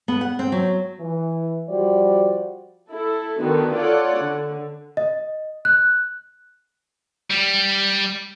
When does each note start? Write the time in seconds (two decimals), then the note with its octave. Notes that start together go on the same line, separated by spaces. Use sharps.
0.08 B3
0.21 F#5
0.39 C4
0.52 F#3
1.00 E3
1.68 F3 G3 F#4 G4 C5 D5
2.89 E4 A4
3.40 D3 D#3 B3 F#4
3.75 F4 A4 C#5 D5 F#5
4.20 D3
4.97 D#5
5.65 F#6
7.30 G3